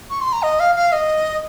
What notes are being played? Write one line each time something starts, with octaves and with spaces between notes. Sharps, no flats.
C#6
C6
A#5
D#5
F5
F5
D#5